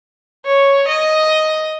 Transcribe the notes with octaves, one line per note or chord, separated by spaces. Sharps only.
C#5
D#5